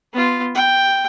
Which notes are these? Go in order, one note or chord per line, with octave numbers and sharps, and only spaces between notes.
B3 F4
G5